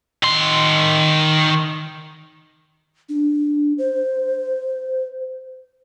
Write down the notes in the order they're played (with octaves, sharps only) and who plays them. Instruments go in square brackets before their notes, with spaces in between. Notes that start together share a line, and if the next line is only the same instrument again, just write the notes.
[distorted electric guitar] D#3 C6
[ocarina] D4
C5